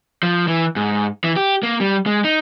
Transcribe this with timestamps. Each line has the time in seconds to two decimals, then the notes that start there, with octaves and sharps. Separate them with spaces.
0.23 F3
0.48 E3
0.76 G#2
1.24 E3
1.36 G4
1.63 A#3
1.80 G3
2.06 G#3
2.24 D#4